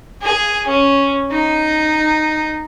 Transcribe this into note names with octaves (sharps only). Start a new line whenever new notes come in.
G#4
C#4
D#4